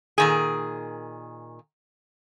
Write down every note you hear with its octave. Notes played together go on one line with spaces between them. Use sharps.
A#2 D#3 G#4